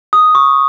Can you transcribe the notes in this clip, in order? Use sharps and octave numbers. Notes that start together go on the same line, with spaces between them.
D#6
C#6